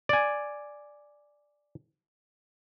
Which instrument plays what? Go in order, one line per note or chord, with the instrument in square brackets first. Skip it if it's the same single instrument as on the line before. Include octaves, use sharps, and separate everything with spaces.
[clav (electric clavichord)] D5 G#5